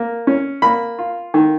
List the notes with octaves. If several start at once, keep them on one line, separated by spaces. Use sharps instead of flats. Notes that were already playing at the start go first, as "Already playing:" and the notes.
Already playing: A#3
C#4
A#3 B5
F4
D#3